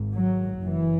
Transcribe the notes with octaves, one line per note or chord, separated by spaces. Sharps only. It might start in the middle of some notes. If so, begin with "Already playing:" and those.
Already playing: G#1 G#2
F#3
F#1 F#2 C#3 E3